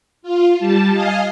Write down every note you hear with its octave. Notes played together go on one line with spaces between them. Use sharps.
F4
G3 A5
D#5 F5 G#5